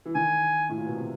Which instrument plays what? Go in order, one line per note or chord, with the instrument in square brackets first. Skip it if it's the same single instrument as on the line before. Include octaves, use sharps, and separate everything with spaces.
[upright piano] E3
[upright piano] D#3 [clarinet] G#5
[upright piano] A2
A#2
B2
C3